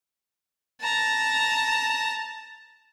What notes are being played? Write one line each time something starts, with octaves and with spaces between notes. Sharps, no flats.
A5 A#5